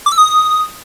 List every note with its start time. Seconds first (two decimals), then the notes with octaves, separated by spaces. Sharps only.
0.06 D6
0.12 E6
0.18 D#6